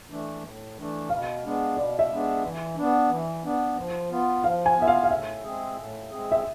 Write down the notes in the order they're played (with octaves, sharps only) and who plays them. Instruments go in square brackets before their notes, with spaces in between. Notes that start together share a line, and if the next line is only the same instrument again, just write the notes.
[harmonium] E3 A3 D4
A2
E3 A3 D4
[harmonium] B2 [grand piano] F5
[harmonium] G#3 B3 D4
[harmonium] B2 [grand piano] D5
[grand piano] E5
[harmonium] G#3 B3 D4
E3
B3 D4
E3
B3 D4
F3
B3 F4
[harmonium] F3 [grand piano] F5
[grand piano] G#5
[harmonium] B3 F4 [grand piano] E5
[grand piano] F5
F5
[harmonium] A2 [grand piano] E5
[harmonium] G#3 C4 G#4
A2
G#3 C4 G#4
[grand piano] E5